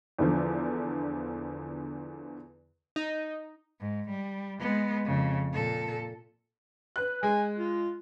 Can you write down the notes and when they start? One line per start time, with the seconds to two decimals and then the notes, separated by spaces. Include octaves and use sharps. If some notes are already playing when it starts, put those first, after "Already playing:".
0.19 E2 D3 F3
2.96 D#4
3.81 G#2
4.10 G3
4.59 G#3 B3
5.05 F2 C#3
5.53 A#2 A4
6.96 B4 F#6
7.23 G#3 G#5
7.58 F4